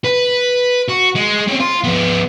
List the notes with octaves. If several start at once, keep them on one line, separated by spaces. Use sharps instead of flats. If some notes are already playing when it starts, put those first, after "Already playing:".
B4
F#4
G#3
C4 C#4
F4
F3 B3